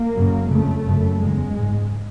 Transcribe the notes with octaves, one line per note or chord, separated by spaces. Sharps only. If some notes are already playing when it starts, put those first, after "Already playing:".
Already playing: A#3
F#2 C#3
F2 C#3 A3
F#2 C#3
E2 C#3 G#3
G#2